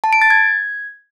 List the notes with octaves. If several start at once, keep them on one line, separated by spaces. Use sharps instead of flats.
A5
D7
A6
G#6